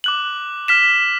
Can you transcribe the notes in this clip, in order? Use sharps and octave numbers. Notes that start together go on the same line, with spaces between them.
D6 F#6 F#7
F6 B6 E7